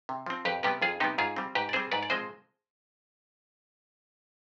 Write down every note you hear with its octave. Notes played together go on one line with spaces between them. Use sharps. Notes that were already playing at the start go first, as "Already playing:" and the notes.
C3
F3 C4
F2 G4 B4
C3 G3 B3 G4 B4
F2 F4 G#4
C3 G3 B3 D#4 G4
G#2 F4 G#4
G3 C4
G#2 G4 B4
D5
G3 C4 G#4 C5
G#2 B4 D5
D5
F3 G#3 C4 C5 D#5